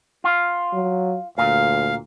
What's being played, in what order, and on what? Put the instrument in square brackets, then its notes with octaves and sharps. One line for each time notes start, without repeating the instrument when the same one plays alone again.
[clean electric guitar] F4
[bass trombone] F#3
[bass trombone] D2 [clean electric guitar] A#2 [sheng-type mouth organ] F5